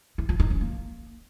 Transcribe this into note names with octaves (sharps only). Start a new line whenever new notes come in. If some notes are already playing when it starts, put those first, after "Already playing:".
E4
F4
D#4
C#4
A#3